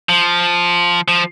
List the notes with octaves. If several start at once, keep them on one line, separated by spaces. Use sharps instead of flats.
F3
F3